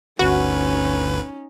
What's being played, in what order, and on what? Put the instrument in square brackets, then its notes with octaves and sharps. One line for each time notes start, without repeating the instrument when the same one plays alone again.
[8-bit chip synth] G1 D2 B4 [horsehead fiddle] C#4 D#4 [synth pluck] F#4